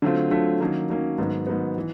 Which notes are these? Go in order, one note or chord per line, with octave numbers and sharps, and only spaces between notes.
D3 F#3 A3 C4 F4
D3 F#3 A3 C4 F4
D#3 F#3 A#3 C#4
D#3 F#3 A#3 C#4
G#2 D#3 F#3 B3
G#2 D#3 F#3 B3
E3